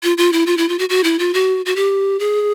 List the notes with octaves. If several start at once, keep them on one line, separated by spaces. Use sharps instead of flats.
F4
F4
E4
F4
E4
F4
F#4
F#4
E4
F4
F#4
F#4
G4
G#4